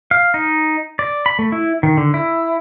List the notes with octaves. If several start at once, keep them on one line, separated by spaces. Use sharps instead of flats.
F5
D#4
D5
B5
A3
E4
D#3
D3
E4